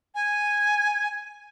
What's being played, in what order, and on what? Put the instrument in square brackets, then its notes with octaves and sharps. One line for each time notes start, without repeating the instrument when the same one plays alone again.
[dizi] G#5